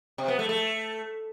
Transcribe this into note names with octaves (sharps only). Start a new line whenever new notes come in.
C3
B3
A3
A3